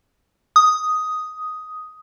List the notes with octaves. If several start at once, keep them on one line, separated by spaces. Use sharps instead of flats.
D#6